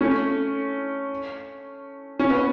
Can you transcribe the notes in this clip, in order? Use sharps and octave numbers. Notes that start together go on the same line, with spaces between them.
A3 C#4
C#4
B3